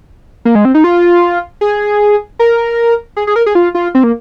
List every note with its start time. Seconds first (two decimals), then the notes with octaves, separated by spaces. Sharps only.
0.45 A#3
0.55 G#3
0.65 C4
0.75 D#4
0.84 F4
1.61 G#4
2.39 A#4
3.17 G#4
3.27 G#4
3.36 A#4
3.46 G#4
3.55 F4
3.75 F4
3.95 C4
4.04 A#3